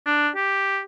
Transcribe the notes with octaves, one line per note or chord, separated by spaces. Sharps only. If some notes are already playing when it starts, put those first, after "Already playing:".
D4
G4